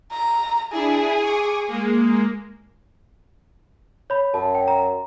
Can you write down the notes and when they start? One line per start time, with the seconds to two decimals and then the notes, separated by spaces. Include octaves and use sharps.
0.12 A#5
0.73 D4 E4 G#4
1.21 C#6 D6
1.68 G#3 A#3
4.10 C#5 B5
4.34 F#2 A5
4.55 G5
4.68 A#5